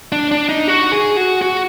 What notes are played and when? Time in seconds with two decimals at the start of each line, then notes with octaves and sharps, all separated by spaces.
0.12 D4
0.32 D4
0.49 D#4
0.67 F#4
0.92 G#4
1.17 F#4
1.42 F#4